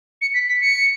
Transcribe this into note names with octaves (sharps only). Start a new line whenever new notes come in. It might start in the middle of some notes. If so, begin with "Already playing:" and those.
C#7
B6
B6
C#7